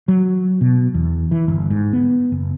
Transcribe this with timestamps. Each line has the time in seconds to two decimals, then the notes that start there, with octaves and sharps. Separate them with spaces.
0.08 F#3
0.61 B2
0.94 E2
1.31 E3
1.48 G1
1.70 G#2
1.93 B3
2.32 F#1